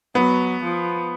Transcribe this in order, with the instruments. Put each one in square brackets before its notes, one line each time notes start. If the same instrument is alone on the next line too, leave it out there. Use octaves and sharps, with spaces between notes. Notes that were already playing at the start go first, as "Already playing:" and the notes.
[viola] F#3 [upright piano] B3
[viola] F3